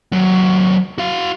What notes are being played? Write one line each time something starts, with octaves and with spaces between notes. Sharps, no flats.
D#2 F#3
F#4 F5